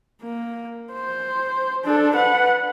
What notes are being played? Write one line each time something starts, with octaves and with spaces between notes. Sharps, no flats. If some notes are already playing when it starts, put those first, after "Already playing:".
A#3
C5
D4 A4
B4 F#5